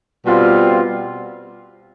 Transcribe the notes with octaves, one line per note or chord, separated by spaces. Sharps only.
B2 G3 C4 F4